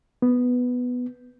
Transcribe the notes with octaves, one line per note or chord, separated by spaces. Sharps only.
B3